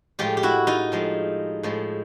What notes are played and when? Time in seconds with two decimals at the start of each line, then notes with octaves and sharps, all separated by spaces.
0.19 A2 F3 G#3 F4 G4
0.37 G4
0.43 E4 F#4
0.67 D#4 F4
0.92 A2 F3 G#3
1.63 A2 F3 G#3